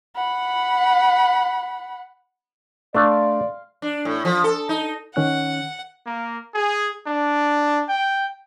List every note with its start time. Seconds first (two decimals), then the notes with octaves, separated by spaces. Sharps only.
0.16 F#5 B5
2.94 A3 D4 D5 F5 C6
3.82 D4
4.05 A2
4.25 F3
4.44 A4
4.69 D#4
5.16 D#3 C#4 F#5 F#6
6.06 A#3
6.55 G#4
7.08 D4
7.89 G5